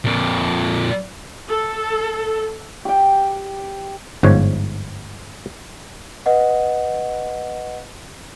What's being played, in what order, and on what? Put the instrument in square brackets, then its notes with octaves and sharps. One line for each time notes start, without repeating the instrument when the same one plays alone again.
[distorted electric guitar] F2 A#2
[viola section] A4
[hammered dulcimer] G4 G5
[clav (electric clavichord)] G1 G#2 F3 C#5
[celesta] B4 D#5 F#5